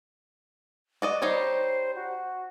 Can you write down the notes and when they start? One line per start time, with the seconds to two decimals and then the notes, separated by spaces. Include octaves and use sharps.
1.02 F#4 D5 D#5
1.22 G3 D#4 C5 C#5
1.96 F#4